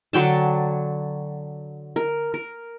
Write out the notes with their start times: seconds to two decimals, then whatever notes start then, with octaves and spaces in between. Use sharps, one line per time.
0.13 D3 F#3 G5 A5
1.96 A#4
2.34 A#4